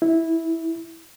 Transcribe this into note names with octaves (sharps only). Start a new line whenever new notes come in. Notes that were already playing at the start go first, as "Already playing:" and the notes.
E4